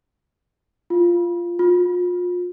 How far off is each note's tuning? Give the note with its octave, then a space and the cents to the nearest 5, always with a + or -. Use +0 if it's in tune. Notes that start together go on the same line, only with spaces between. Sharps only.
F4 -10
F4 +30